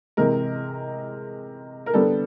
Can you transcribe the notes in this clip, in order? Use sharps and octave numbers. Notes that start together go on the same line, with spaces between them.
C3 E3 G#3 A#4
A#4
D3 G3 B3 A4